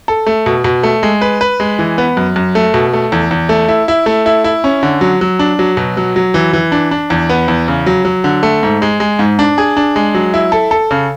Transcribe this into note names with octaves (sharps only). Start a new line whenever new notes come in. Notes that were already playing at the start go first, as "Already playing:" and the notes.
A4
A3
B2
B2
A3
G#3
B4
B4
G#3
E3
B3
F#2
F#2
A3
B2
A3
E2
E2
A3
E4
E4
A3
E4
E4
C#4
D3
F#3
F#3
D4
F#3
B2
F#3
F#3
E3
E3
D4
D4
E2
B3
E2
C#3
F#3
F#3
D3
A3
G#2
G#3
G#3
G#2
D4
G#4
D4
G#3
F#3
E4
A4
A4
C#3